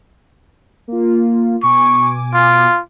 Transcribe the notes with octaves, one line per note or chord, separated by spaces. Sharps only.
A#3 F4
B2 G#5 C#6 D6
F4